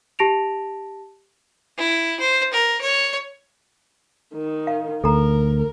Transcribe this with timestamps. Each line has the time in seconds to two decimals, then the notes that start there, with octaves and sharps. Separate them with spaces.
0.19 G4 A5 A#6 D7 F7
1.78 E4
2.20 C5
2.53 A#4
2.82 C#5
4.34 D#3
4.67 F5
5.04 D2 A4 A#4 A#5